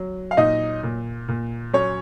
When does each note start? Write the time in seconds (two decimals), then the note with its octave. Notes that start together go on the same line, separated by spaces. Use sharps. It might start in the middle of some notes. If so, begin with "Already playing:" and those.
Already playing: F#3
0.31 F5
0.37 A#2 D#4 D#5
0.83 A#2
1.28 A#2
1.73 F#3 C#4 C#5